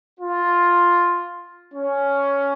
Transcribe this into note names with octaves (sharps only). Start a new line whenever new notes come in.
F4
C#4